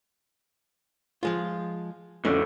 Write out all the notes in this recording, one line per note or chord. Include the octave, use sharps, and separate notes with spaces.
F3 G#3 F4
F2 A2 D3 C#4 D#5